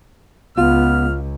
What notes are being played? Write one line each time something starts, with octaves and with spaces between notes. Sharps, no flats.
C#2 B3 F4 F6